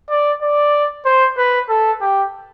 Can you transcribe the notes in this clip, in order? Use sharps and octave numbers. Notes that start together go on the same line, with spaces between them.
D5
D5
C5
B4
A4
G4